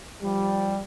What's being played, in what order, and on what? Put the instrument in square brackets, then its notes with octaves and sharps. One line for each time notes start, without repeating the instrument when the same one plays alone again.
[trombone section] F3 G3